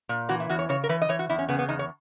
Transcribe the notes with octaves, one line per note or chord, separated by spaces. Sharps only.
A#2
E3 F#4
E4
E2 F#4
C#5
C#3 C#5
A#4
E3 B4
D#5
E3 C#5
F#4
E2 E4
C#4
C#3 B3
B3
E2 D#4
C#5